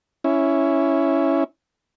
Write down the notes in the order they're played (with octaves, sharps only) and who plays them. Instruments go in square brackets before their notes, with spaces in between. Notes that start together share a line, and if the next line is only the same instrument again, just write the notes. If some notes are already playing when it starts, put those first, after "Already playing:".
[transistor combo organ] C#4 E4